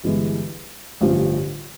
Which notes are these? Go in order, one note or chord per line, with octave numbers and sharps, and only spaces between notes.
G1 G2 E3 G#3
A1 G2 D3 F3